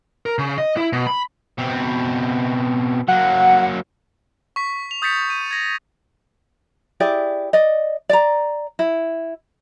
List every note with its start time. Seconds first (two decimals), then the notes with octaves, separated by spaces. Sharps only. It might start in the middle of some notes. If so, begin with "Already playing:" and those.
0.26 A#4
0.38 C#3
0.58 D#5
0.77 E4
0.93 B2
1.07 B5
1.58 B2 C4
3.08 F#3 A#3 F#5
4.56 C#6 B6
4.91 F7
5.02 D#6 G6 A6 B6 C#7
5.30 D#7
5.51 G#6 A#6
7.00 E4 G4 G#4 D5
7.53 D5 D#5
8.09 D5 A#5
8.79 E4